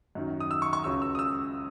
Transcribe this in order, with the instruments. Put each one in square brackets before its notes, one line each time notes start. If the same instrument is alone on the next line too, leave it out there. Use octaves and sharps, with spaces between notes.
[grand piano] F#2 D#3 F#3
D#6
E6
C#6
C#6
C#2 C#3 F#3 C#4 E6
E6
D#6
E6